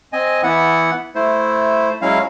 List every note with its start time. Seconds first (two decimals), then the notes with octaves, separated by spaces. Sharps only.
0.13 C4 D#5 G#5
0.43 E3 B3 E4 F#5
1.15 A3 E4 C5
2.02 F#3 G#3 C#4 E4 F5